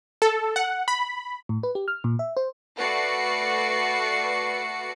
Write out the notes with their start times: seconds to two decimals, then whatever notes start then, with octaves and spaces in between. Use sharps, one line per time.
0.22 A4
0.56 F#5
0.88 B5
1.49 A2
1.63 B4
1.75 G4
1.88 F6
2.04 A#2
2.19 E5
2.37 C5
2.77 A3 F#4 B4 D5 C7 C#7